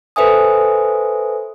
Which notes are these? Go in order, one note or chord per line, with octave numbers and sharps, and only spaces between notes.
A4 B4 C5 E5 G#5 D#6